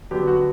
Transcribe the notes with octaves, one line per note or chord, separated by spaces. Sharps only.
D3 F#3 B3 G4
F#4